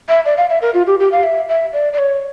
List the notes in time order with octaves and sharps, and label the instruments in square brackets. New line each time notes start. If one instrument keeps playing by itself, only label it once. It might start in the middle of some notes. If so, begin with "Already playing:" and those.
[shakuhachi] E5
D5
F5
E5
A#4
F4
G4
G4
F5
E5
E5
D5
D5
C#5